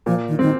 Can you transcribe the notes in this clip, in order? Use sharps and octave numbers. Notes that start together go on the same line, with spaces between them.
A#2 F3
D#3
D#3 C4